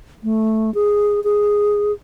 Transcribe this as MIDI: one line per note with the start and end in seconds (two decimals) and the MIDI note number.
0.24 0.73 57
0.75 1.23 68
1.24 1.92 68